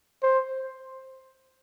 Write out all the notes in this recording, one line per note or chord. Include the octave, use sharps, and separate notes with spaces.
C5